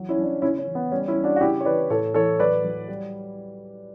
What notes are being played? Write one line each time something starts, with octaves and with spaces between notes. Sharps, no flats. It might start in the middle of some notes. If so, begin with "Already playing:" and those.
Already playing: E3 F#3
C#4 E4
F#3 D4
C#4
C#3 C#4 E4
C#4
E3
B3
G3 C#4
C#4 E4
G3
D4 F#4
F#4
C#3 E4 G4
C#5
E3 B4 D5
A2 A4 C#5
E3 A4 C#5
F#3 B4 D5
F#3
G3